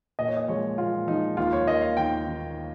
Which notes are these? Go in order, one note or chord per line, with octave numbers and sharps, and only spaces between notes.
A#2 D#5
C#5
D#5
F3 G#3 C#5
A#2 F4
F3 G#3 D#4
D#2 F4
C#5
D#3 A#3 D#5
F5
D#2 G5
D#3 A#3